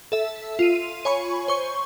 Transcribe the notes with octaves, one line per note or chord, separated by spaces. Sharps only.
A4 E5
F4 D#7
C#5 G#5 B5 C#6
C5 C#6